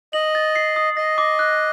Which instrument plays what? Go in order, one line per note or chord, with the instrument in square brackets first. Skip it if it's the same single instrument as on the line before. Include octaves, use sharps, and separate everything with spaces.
[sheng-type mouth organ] D#5 [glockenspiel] F#7
[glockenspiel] A6
C7
D#6
[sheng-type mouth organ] D#5 [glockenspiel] A#6
[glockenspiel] D6
F#6